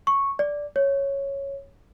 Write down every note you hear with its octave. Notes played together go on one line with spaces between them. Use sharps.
C#6
D5
C#5